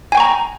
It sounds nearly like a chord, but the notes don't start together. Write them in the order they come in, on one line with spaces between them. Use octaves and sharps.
G#5 G5 C#6 A#5